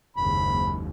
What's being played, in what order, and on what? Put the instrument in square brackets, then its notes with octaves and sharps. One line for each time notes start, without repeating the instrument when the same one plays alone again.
[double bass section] F#1 D#2 G#2 [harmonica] B5